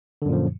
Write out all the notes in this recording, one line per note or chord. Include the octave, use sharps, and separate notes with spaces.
F#2 A#2 D3 F3